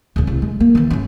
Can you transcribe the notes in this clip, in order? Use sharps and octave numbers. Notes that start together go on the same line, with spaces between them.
D1 C#3
C2
G#3
A#3
D#3 E3
G2 C#4